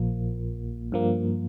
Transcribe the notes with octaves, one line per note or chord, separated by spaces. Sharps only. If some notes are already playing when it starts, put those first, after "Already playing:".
Already playing: A#1 A#2 F3 A#3
G2 F3 A#3